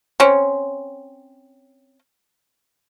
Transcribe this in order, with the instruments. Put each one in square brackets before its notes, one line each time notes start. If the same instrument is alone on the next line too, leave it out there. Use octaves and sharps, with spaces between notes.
[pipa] C4 C#4